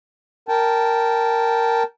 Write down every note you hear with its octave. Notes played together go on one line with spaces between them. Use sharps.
A#4 G5 A5